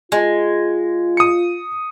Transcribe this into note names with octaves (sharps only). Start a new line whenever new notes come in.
G#3 F4
D#6 C#7